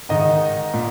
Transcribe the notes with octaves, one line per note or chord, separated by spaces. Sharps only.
G#2 D#3 D#5
A#2